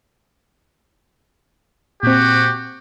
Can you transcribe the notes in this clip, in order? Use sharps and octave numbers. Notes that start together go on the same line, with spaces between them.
A#2 C4 F#4 G4